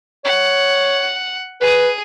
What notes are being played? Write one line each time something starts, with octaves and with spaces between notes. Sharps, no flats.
C#5 F#5
G#4 B4 D#6